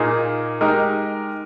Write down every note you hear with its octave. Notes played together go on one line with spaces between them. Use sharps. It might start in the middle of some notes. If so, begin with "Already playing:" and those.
Already playing: A#2 A#3 D#4 G#4
G#3 D#4 G4 A#4